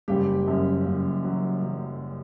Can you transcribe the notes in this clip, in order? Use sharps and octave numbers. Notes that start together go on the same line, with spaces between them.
F#1 G3 G4
F#2
F#1
F#3
F#3